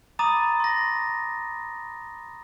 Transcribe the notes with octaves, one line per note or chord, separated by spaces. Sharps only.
A#5 B5 D6 D#6 A6 D#7
C6 A#6